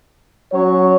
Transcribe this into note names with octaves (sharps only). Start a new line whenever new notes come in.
F#3 C#4 F#4 C#5